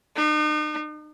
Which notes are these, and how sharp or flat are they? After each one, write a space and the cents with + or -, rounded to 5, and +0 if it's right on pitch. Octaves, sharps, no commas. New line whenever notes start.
D#4 -40